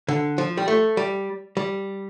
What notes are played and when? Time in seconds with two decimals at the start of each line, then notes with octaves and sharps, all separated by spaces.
0.08 D3
0.38 F3
0.57 G3
0.68 A3
0.97 G3
1.57 G3